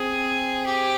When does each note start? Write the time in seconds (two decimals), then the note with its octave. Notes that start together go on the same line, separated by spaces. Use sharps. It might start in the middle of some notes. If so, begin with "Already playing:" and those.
Already playing: C4 G#4
0.66 G4